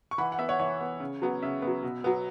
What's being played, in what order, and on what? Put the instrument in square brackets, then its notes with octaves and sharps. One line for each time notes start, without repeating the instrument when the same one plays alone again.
[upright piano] C#6
E3 F#5 B5
F#5
B3 E5
C#5 F#5
E3 C#5
B3
C#3
F#3 B3
C#3 E5
F#3 B3
B2
F#3 B3